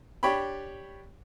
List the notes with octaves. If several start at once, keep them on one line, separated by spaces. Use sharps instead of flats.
D4 G4 C#5 G5 B5